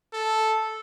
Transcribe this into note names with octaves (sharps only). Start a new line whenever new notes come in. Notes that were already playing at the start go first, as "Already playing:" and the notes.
A4